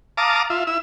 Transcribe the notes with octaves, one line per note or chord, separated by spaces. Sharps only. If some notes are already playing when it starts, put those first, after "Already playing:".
F5 A5 A#5 D6 D#6
F4 E5
E4 E6